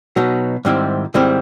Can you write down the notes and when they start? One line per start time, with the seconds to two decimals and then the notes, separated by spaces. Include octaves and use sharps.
0.16 B2 F#3 B3 D#4
0.65 G#2 D#3 G3 C4 E4
1.14 G#2 D#3 G3 C4 E4